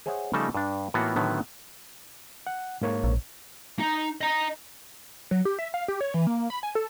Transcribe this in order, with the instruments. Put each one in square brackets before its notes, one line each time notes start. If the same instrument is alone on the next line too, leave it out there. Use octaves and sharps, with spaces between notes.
[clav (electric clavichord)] G#4 C5 C#5 E5 F#5
C#3 F3 G3 A3 D#4 A5
G2 D4
A2 E3 A#3 B3 F4 F#4
A2 D3 D#3 F#3 B3
[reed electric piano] F#5
G#2 A#3 C#5
[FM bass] A#1
[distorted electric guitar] D#4
D#5 A#5
[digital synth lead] F#3
G4
E5
F5
G4
C#5
E3
A#3
B5
G#5
A4